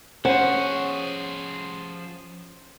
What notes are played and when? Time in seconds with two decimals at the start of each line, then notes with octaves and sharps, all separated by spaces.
0.25 F3 C#4 G#4 C5 F#5